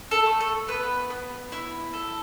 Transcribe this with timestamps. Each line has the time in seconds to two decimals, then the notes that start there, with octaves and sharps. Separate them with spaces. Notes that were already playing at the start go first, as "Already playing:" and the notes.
0.11 A4
0.26 A3
0.40 A4
0.68 B3 B4
1.10 B3
1.52 E4
1.93 A4